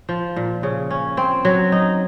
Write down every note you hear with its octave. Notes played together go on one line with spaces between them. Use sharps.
F3
A#2
C#3
C#4
C4
F#3
D#4